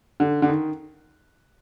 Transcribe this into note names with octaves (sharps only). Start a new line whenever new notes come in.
D3
D3
D#3